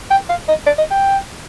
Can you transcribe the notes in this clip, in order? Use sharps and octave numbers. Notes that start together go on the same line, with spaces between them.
G5
F5
D#5
D5
D#5
G5